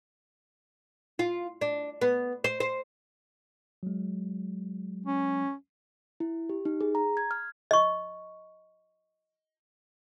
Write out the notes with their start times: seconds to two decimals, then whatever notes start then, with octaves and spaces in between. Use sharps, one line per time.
1.19 F4
1.61 D4
2.01 B3
2.44 C5
2.60 C5
3.83 F#3 G#3
5.06 C#4
6.20 E4
6.49 G4
6.65 D#4
6.81 G#4
6.95 A#5
7.17 G#6
7.31 F6
7.71 D#5 C#6